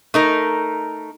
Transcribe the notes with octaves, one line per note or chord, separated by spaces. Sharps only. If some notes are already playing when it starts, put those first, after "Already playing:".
A3 D#4 A#4